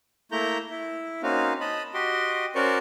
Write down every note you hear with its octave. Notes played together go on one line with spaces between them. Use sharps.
A3 A#3 E4 A#5 G6
E4
A#3 C4 C#4 D#4 F#4 F5
D#5 A5 B5
F#4 G4 D#5 C6 D6
C#4 F#4 A#4 C5 D5 C#6